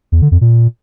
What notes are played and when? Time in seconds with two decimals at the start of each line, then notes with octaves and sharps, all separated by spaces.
0.12 E2
0.22 D3
0.31 F2
0.41 A#2